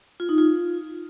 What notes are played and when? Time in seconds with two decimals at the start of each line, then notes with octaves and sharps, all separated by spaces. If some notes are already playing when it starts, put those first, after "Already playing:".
0.20 F4
0.29 D#4
0.38 F4